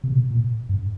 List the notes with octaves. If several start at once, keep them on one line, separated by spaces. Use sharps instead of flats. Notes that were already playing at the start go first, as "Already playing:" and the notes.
C3
B2
A#2
G2